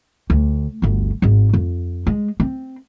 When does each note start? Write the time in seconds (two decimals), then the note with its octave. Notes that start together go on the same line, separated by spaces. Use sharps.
0.30 D2
0.82 G1 D2
1.22 G#1 G#2
1.53 F2
2.07 G#3
2.40 C4